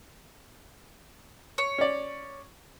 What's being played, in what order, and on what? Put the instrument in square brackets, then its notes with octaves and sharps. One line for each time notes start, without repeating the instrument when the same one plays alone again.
[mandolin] C#5
[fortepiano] C#4 D5